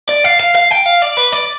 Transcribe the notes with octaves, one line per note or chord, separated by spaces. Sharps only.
D5
F5
F5
F5
G5
F5
D5
B4
D5